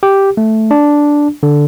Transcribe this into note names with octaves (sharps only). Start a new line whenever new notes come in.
G4
A3
D4
D3